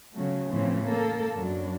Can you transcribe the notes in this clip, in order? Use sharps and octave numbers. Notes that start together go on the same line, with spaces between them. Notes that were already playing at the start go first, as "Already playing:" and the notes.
C#3 F#3 A3
A2 C#3 E3 F3 C4
A#3 A4
F#2 F#3 D4